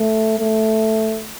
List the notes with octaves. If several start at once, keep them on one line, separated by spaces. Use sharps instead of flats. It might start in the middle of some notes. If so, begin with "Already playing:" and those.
Already playing: A3
A3